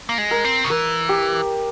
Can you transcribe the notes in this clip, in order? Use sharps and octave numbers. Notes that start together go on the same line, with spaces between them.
A#3
G#3
A#4
C4
C#3
E3 A#4
G4